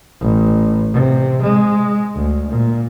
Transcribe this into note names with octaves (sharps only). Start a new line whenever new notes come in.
A1
C3
G#3
D2
A#2